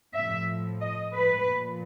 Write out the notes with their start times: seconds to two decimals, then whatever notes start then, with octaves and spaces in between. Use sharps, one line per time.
0.14 A2 F3 E5
0.80 D#5
1.14 B4
1.47 A#2 F3